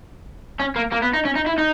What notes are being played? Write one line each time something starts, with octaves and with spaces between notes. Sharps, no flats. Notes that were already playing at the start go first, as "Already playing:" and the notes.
C#4
A#3
A#3
B3
D#4
C#4
D#4
E4
D#4